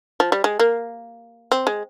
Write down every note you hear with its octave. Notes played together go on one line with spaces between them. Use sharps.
F3
G3
G#3
A#3
C4
G#3